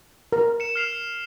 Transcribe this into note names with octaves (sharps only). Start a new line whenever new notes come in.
A#4
C#7 E7
F6 C7 F7